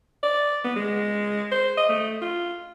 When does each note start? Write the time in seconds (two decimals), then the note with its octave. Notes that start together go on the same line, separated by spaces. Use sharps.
0.23 D5
0.65 B3
0.76 G#3
1.52 C5
1.77 D#5
1.89 A3
2.22 F4